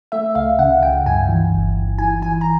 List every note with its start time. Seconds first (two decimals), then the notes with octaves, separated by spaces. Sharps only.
0.12 A3 E5
0.35 C#2 F5
0.59 C#3 F#5
0.82 C#2 G5
1.06 G2 G#5
1.29 E3
1.52 G1
1.76 G1
1.98 E3 G#5
2.22 E3 G#5
2.41 A#5